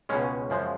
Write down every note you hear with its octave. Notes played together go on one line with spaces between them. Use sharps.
C#2 B2 G#3 C#4
F#2 C#3 F3 G#3